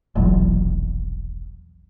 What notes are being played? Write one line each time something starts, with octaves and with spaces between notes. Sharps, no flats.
E1 A#1 E2 F#3